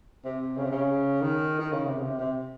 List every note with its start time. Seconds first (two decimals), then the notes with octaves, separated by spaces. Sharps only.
0.24 C3
0.57 C#3
0.64 C3
0.71 C#3
1.22 D#3
1.60 D#3
1.72 C#3
1.86 C3
1.98 C#3
2.03 C3
2.19 C3